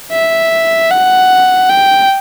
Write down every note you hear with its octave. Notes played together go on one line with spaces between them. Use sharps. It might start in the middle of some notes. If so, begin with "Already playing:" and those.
E5
F#5
G5